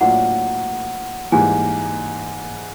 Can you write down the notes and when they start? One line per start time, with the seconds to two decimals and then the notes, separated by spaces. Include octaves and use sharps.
0.01 A2 F#3 A#3 D4 F4 F#5
1.32 G#2 E3 G3 A#3 G#5